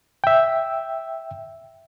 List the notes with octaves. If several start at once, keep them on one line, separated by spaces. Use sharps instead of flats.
E5 G5